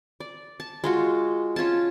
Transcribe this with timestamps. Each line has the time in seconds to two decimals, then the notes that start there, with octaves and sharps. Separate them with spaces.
0.20 D5
0.60 A5
0.84 G#3 F4 F#4
1.56 C#4 F4 G#5 A5